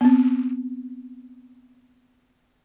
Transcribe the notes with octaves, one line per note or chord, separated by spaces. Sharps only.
B3 C4